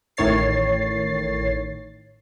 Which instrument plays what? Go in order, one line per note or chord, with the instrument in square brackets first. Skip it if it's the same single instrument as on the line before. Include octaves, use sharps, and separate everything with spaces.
[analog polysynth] A1 A2 D#3 C#5 A6 C7